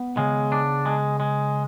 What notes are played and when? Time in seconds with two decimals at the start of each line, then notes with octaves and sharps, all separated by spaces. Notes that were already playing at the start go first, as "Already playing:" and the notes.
Already playing: B3
0.17 C#3 G#3
0.52 D4
0.85 G#3
1.20 G#3